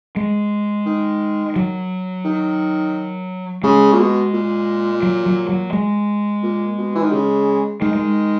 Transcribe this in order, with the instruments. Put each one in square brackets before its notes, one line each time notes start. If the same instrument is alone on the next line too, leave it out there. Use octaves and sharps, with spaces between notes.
[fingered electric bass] G#3
[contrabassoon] D#3
[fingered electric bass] F#3
[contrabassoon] D#3
[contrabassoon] C#3 [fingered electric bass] G#3
[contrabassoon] A#2
B2
A#2
[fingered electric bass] F#3
F#3
F#3
G#3
[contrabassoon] A#2
B2
E3
D#3
C#3
[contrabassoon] D#3 [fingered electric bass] G#3
[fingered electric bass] G#3